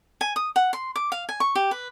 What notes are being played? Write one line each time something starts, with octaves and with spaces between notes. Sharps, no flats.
G#5
D#6
F#5
C6
D6
F5
G#5
C#6
G4
B4